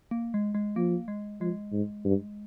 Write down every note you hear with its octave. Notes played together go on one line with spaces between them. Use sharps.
A#3
G#3
G#3
F3 A#3
G#3
F3 G#3
G#2
G2